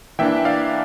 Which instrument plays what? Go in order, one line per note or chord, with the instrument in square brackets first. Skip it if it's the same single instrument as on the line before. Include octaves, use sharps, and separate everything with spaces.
[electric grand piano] E3 A#3 D4 E5 G5
D5 F5